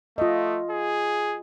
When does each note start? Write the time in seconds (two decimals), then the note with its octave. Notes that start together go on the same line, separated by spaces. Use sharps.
0.18 A3 F4 D#5
0.70 G#4